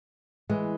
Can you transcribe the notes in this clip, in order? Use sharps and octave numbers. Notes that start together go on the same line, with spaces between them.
E3 G#3